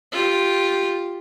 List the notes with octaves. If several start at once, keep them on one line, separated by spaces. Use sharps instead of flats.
F4 G4